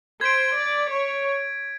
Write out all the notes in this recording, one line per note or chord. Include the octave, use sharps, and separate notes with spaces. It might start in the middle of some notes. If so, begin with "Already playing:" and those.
C5 G#6 B6 D7
D5
C#5